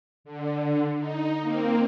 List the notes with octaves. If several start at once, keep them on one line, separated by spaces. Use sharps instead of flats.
D3
D#4
A#3 C4